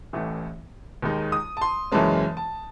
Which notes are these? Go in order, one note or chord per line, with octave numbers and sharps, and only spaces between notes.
A1 A2 E3 A3
D#2 D#3 G#3 D#4
D#6
A5
C6
F#1 F#2 E3 G#3 C#4 A5
A5